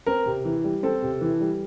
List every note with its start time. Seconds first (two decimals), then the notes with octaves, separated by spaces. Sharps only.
0.06 C4 A#4
0.26 C3
0.45 E3
0.64 G3
0.83 C4 A4
1.02 C3
1.21 E3
1.41 G3